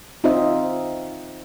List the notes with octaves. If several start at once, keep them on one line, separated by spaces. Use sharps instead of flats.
C4 D#4 F4 C5 D#5 E5